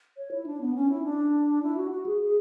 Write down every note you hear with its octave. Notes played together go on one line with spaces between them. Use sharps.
C#5
E4
D4
B3
C#4
E4
D4
E4
F#4
F#4
G#4
G#4